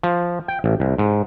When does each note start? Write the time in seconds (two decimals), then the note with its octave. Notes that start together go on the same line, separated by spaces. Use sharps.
0.03 F3
0.48 G5
0.64 A1
0.80 C2
0.98 G#2